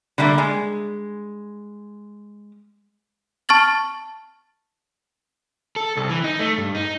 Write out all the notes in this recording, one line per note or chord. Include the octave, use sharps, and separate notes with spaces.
D3 G3 A3 A#3
G#3
A5 C#6 F6 A6 F#7
A4
C2
E3
D#4
A3
G2
D#4